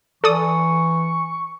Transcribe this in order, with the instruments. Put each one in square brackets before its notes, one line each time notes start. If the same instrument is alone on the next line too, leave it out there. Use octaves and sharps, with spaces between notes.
[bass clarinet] E3 [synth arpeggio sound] A4 D5 D#6 [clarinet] C#6